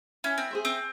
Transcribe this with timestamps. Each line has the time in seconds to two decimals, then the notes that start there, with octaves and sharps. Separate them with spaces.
0.24 C#4 E4
0.38 C4
0.51 G#4 C5 E5
0.65 C4